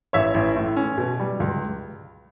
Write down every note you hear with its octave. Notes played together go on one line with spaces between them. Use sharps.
A1 C#5 E5
A1
A2
C#4
B2
G3
C#2